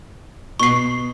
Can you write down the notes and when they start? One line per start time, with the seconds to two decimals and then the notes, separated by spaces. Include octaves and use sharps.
0.60 B2 C#6 C7